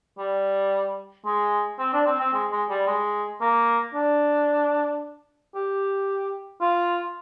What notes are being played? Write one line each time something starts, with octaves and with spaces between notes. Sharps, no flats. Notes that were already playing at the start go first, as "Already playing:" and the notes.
G3
G#3
C4
D4
C4
C4
G#3
G#3
G3
G#3
A#3
D4
G4
F4